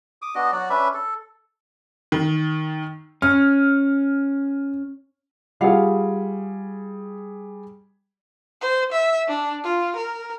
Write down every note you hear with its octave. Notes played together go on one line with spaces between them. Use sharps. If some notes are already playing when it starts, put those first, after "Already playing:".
D6 D#6
B3 D4 F#4 D#5
F#3 F#4 D5
C#4 D4 B4 E5
A4
D#3
C#4 F6
G3 F4 G#4 F5 F#5
C5
E5
D4
F4
A#4